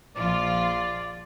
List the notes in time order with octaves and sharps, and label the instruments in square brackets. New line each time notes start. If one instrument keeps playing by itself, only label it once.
[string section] A#1 F3 F4 [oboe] D5